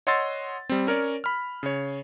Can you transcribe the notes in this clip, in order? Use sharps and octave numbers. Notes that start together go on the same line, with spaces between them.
C#5 D#5 F#5 C6 E6 A6
G3 C4
C#4 A#4 C#5 D5
B5 F6
C#3 C#5